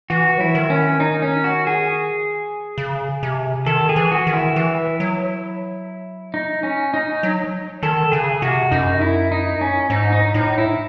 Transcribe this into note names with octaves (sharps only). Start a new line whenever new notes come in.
E3 F#4
F#3 E4
E3
D#3
C#4
D#4
C#4
F#4
G#4
C#3
C3
D#3 A4
G#4
E3
F#4
D#3
E4
E3
F#3
D#4
C#4
D#4
F#3
D#3 A4
C#3 G#4
C3 F#4
F#2 D#4
E4
D#4
C#4
G#2 D#4
D#4
A2 D#4
E4